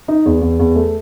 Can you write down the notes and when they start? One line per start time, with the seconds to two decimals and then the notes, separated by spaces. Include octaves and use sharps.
0.08 D#4
0.26 E2
0.41 E2
0.59 E2
0.75 A3